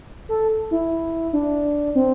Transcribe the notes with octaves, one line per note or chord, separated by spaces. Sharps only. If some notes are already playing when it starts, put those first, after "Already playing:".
A4
E4
D4
C4